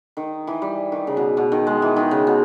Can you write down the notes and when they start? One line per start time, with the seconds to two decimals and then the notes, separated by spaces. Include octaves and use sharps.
0.17 D#3
0.47 E3
0.62 G3
0.92 D#3
1.07 C#3
1.17 B2
1.37 B2
1.52 D#3
1.67 G#3
1.82 E3
1.96 D#3
2.11 C#3
2.27 B2